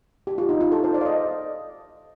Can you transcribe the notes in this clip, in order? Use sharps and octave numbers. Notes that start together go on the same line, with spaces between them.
G4
F4
D#4
F4
A4
C5
D5
F5
D#5